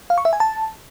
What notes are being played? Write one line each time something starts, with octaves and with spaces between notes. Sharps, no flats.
F5
C#6
E5
G#5
A5